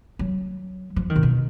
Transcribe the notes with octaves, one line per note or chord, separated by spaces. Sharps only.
F#3
F3
D#3
A#2
B2